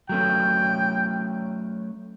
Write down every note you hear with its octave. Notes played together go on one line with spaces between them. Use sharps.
F#3 A3 C#4 G5